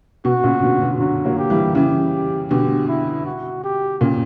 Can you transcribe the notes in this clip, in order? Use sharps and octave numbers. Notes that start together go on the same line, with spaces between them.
B2 F#4
A#2 C#3
B2 D3
B2 D3
D3 F#3 F#4
F#3 A#3
G4
E3 G3
C#3 E3 G4
B2 D3 G4
E4
F#4
G4
A#2 C#3